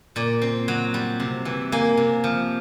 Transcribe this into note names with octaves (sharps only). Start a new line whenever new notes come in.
A#2 D5
C4
F#3
G3
C3
E3
A#3 G#5
C3
F3